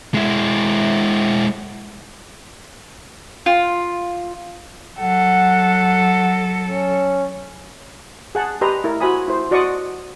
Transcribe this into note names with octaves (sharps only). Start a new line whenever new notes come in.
G#3 E4
F4
F#3 A4 F#5
C#4
G#4 F#5 A5
G4 B4 D#5 A#5 C6
E4 A#4
F#4 C5 E5 G#5 B5 D#6
E4 C5
F#4 D5 D#5 C6 C#6 D#6